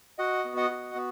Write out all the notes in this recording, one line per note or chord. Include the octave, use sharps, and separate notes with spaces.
F#4 D#5 F#5
B3
D#5 F#5
F#4
B3